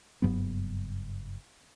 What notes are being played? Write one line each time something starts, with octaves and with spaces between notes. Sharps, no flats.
F#1 G2 F#3 B3